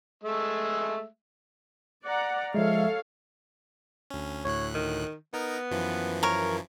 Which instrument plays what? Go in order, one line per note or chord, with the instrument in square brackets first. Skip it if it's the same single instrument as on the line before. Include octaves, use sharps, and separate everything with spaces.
[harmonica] G#3 A3 E5
[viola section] D5 F#5 A#5
[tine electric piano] F3 G#3 [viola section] A4 C#5 F5 [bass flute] E5
[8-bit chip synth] D2 C#4
[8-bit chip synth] D2 A2 F#6 [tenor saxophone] C#5
[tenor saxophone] D#3
[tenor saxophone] B3 [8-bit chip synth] D#4 A#4
[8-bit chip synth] F#2 E3 F3
[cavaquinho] A#4 C#5